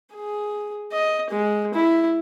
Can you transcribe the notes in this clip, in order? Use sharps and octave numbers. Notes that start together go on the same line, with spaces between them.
G#4
D#5
G#3
E4